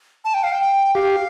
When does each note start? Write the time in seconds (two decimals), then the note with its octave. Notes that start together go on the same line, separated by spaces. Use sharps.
0.25 A5
0.34 G5
0.43 F5
0.52 G5
0.95 G4 F5